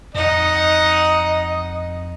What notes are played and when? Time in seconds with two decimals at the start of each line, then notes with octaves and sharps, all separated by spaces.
0.15 F2 D#4 D#5 F#5